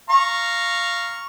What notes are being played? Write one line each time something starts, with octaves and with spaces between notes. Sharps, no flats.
F5 A#5 C#6